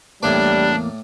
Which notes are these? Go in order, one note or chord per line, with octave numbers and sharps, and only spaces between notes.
E2 A2 G3 A#3 D4 D5